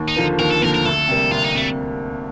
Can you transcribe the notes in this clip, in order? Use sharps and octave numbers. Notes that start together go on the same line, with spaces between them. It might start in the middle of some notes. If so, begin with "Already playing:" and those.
Already playing: D#2
D#4
D3 F3 A#3
D#2 A#4
A4
D3 F3 A#3 A#4
A#4
D2 A4
C3 G3 A#3
D2 F4
D#4
C3 A3